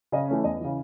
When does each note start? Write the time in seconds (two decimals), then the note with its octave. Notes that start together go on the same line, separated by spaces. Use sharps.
0.12 C#3 D#5
0.28 E3 A3 C#4
0.44 E2 D#5
0.60 C#3 E3